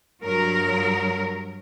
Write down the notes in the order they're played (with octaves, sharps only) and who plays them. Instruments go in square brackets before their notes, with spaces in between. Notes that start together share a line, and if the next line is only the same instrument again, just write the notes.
[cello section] G2 F#3 A#4